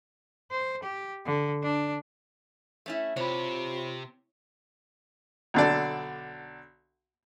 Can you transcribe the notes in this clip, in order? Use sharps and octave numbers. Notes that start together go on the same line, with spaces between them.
C5
G4
D3
D4
A3 C#4 E4
C3 F4 G4 C5 C#5 B5
B1 D3 D4 A4 D5